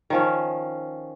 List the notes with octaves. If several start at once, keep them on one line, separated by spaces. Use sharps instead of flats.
D#3 F3 C#4